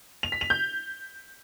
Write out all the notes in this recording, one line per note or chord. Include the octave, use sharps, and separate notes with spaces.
F7
B6
F7
G6